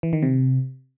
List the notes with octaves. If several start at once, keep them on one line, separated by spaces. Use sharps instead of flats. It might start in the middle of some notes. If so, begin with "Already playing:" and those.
E3
D#3
C3